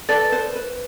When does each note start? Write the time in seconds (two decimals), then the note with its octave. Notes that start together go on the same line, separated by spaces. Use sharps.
0.09 A4 B4 D5
0.32 B4 C5
0.56 B4